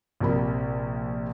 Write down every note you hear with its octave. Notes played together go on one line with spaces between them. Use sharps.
A#1 C3 A#4 B5